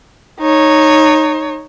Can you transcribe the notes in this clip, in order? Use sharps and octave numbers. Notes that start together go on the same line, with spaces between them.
D#4 C#5